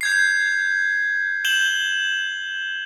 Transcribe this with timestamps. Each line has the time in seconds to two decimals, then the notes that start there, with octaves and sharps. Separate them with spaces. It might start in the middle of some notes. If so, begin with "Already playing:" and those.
0.01 G6 G#6 C7
1.45 G6 E7 F#7 G7